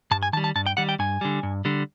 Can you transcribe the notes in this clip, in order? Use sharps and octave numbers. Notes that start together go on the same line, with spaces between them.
G2 A5
G#5
D#3 G3 A5
A5
G2 A5
G5
D#3 G3 F#5
G5
G2 G#5
D3 G3
G2
D3 G3